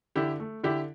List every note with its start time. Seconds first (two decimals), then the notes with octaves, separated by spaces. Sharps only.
0.16 D3 E4 G4
0.40 A3
0.63 D3 E4 G4